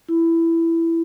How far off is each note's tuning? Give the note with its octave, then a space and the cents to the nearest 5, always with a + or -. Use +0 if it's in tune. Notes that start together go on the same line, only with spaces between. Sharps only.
E4 +10